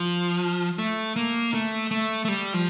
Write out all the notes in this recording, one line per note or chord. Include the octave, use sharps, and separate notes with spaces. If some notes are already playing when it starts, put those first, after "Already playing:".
Already playing: F3
A3
A#3
A3
A3
A3
G3
F3